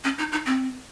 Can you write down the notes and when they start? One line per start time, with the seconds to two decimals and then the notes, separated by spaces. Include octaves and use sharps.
0.04 C#4
0.18 D#4
0.32 D#4
0.46 C4